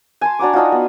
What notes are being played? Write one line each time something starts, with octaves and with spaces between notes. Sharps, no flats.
G#5 A5 C6
D4 F#4 A#5 D6
D4 D#4 F4 F#4
B3